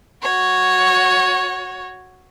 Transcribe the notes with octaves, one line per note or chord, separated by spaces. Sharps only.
F#4 C#5